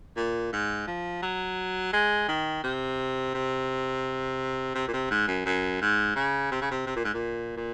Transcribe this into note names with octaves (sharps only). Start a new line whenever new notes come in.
A#2
G#2
F3
F#3
G#3
D#3
C3
C3
C3
A#2
C3
G#2
F#2
F#2
G#2
C#3
C3
C#3
C3
C3
A#2
G#2
A#2
A#2